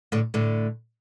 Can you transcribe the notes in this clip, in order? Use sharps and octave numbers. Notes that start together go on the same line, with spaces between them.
A2 D3
A2 D3